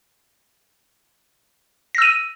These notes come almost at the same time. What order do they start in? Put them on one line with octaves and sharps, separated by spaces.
A#6 E6 D#7